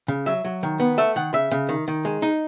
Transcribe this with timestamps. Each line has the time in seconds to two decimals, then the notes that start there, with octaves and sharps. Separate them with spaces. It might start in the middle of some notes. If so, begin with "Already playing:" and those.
0.08 C#3
0.26 F#3 E5
0.45 F#3
0.63 D#3
0.80 B3
0.98 A3 E5
1.16 D#3 F#5
1.33 C#3 E5
1.51 C#3
1.69 D#3
1.88 D#3
2.05 G#3
2.22 D#4